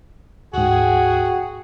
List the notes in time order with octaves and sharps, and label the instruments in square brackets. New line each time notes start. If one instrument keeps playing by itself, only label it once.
[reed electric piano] D2 G#2 [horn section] F#4 G#4 [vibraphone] F#5 G5